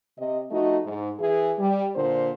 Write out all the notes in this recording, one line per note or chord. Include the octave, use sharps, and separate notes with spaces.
C3 D#5
F3 A3 D#4 F#4 D#5
G#2
E3 E4 G#4
G3
A#2 D3 A#3 C5